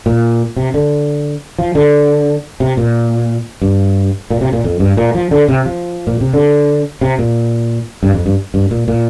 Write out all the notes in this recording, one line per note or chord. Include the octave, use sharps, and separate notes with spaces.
A#2
C3
D3
F3
D3
C3
A#2
G2
A#2
C3
A#2
F2
G2
A#2
F3
D3
C3
F3
A#2
C3
D3
C3
A#2
G2
F2
G2
G2
A#2
A#2